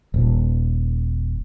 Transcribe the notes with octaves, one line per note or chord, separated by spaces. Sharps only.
D#1